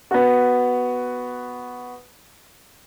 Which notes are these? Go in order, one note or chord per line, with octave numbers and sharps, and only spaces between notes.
B3 F#4